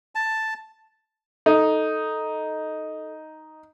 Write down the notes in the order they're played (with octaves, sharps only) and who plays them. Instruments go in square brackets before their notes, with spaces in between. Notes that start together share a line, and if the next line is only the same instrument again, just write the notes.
[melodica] A5
[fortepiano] D#4 [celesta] A4